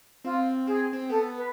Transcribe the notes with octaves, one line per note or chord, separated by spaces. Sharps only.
C4 F4
C4 G#4
C4
B3 A4
B4